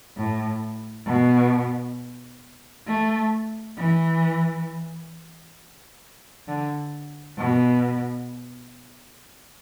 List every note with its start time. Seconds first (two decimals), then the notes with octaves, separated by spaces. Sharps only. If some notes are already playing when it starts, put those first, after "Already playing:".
0.17 A2
1.06 B2
2.87 A3
3.77 E3
6.47 D3
7.38 B2